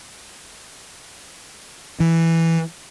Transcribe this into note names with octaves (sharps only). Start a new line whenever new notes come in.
E3